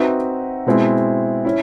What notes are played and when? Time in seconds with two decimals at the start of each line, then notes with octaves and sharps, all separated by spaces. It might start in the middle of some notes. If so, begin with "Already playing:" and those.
Already playing: C4 D#4 F#4 B4 E5
0.67 B2 G#3 C4 E4
1.45 C#4 E4